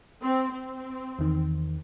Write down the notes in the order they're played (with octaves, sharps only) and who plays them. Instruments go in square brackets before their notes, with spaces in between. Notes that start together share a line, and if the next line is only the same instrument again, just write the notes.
[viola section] C4
C4
[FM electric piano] E2 D#3